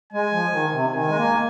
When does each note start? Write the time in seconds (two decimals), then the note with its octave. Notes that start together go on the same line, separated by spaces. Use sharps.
0.12 G#3 G#5
0.32 F3
0.52 D#3
0.72 C3
0.91 D#3 G#5
1.09 G#3
1.17 A#3